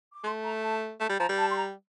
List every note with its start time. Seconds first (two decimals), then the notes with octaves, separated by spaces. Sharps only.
0.13 D6
0.24 A3 C6
0.44 A#5
0.63 A5
1.00 A3 A5
1.09 G3
1.19 F3 A#5
1.29 G3
1.39 A5
1.51 C6
1.57 A#5